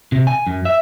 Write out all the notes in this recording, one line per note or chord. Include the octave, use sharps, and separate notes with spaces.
C3
G#5
F#2
E5